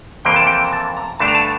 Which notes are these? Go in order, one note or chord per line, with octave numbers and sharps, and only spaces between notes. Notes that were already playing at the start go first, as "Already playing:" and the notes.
F2 C3 E3 A#3 G5
A5
G5
A#5
A5
A#5
G2 D3 A3 D4 A5
A#5
A5